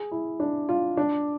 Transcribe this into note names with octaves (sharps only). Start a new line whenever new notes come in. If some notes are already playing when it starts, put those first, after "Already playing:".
Already playing: G#4
E4
D4
F4
D4